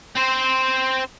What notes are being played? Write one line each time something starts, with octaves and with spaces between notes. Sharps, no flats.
C4 C5